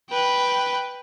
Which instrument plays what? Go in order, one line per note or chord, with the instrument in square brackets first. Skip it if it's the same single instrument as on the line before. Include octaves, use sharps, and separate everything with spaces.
[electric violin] B4 G5